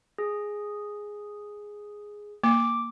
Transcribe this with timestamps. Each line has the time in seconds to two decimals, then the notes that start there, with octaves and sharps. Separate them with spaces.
0.18 G#4
2.44 A#3 D6